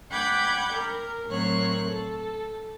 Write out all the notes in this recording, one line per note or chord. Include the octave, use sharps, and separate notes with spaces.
F#5 G5 B5 D6 G6 G#6
A#4
A2 F#3 C4 A#4 C#5 F#6
A4